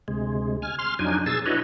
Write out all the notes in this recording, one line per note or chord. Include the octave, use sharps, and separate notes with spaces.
D2 C3 G#3
G#5 F6
C6 F6
F2 F#3 D4 D#4 G#5
B2 G#4 E6 A6
D4 E4 F#4 B4 C#5 D#5